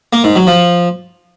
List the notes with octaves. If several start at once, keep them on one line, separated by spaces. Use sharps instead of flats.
A#3
G#2
F#3
F3